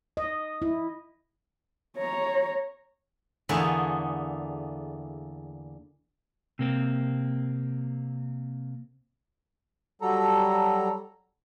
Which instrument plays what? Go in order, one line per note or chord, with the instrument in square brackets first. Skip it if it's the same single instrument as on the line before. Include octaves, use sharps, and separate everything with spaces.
[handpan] D#5
E4
[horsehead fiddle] C#5 A#5
[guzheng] E2 D3 A3 A#3 G#4 F#5
[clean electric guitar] C3 A#3 C4
[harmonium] F#3 G3 A4 A#5